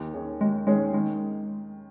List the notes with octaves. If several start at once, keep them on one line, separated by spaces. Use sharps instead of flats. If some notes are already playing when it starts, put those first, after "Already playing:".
Already playing: D#2
D#3 C#4 G#4 C#5
D#2 G#3
D#3 G#3 C#4 G#4 C#5
D#3 G#3